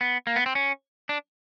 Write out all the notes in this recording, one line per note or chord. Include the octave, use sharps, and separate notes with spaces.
B3
A#3
B3
C4
C#4
D4